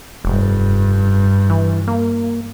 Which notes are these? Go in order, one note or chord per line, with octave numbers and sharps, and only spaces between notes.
F1 G2
E3
A#3